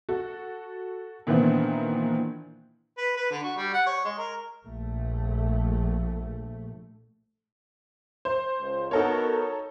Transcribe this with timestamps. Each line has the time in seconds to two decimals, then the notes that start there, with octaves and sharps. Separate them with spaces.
0.09 F#4 A4
1.27 A#2 D#3 E3 B3 C4 D4
2.97 B4
3.17 B4
3.31 D3
3.44 F#4
3.56 G3
3.74 F#5
3.86 C#5
4.05 G#3
4.18 A#4
4.66 A#1 A3
8.25 C5
8.60 C#2
8.91 B3 D#4 F#4 A4 A#4 C#5